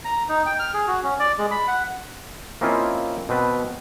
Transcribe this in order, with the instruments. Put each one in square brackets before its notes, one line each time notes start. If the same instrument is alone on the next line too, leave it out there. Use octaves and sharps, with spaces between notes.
[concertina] A#5
D#4
G5
F6
G#4
F#4
C#4
D5
G#3
B5
F#5
[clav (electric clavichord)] A#3 C4 C#4 E4 F4 D#5
B2 C4 B4 A5